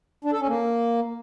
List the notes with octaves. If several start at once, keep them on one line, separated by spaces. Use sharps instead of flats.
D4
A4
C#4
A#3